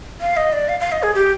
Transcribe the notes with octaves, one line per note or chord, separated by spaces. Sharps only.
F5
D#5
D5
F5
F5
D#5
G#4
G4